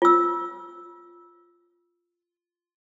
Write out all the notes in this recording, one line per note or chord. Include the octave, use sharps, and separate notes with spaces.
F4 E6